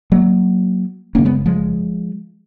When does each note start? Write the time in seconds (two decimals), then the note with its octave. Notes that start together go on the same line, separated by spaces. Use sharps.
0.12 F#3 A#3
1.15 F#1 F2 C#3 A#3 C#4
1.25 G#3 B3
1.46 F3 G#3